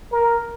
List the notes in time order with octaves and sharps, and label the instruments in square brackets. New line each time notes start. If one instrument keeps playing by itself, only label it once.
[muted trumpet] A#4